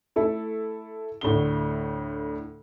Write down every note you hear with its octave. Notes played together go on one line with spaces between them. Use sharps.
A3 E4 A4
D2 A2 D3 G7